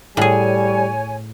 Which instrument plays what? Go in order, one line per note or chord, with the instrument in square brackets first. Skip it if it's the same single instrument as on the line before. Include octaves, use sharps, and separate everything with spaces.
[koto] A2 G#4 [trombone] G3 [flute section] C#5 G#5